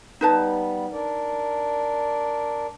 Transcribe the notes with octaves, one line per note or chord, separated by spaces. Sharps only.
G3 B3 D#4 B4 A5
D4 A#4 D5